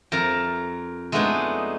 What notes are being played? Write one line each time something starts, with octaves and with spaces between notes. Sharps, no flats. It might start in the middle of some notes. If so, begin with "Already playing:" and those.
F2 A#4 E5 A5 A#5
G#3 A3 B3 D4 D#4 G#4